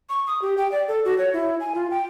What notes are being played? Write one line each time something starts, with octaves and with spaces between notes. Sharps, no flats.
C#6
D#6
G4
G5
D5
A4
F#4
C#5
E4
G#5
F4
G5